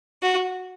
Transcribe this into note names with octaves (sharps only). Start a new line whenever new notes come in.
F#4